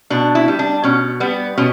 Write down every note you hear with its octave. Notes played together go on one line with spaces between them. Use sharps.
B2 D4
E4
G3
D4
B2 C#4
G3 B3
B2 C#4